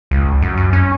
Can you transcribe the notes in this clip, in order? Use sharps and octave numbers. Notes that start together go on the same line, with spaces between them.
C#2
F#2
F#2
C#4